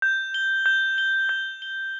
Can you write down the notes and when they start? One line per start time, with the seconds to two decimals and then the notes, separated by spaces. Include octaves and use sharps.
0.02 G6
0.34 G7
0.66 G6
0.98 G7
1.29 G6
1.62 G7